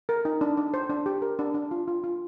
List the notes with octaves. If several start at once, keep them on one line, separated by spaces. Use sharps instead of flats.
A#4
D#4
D4
D4
C5
D4
G4
A#4
D4
D4
F4
F4
F4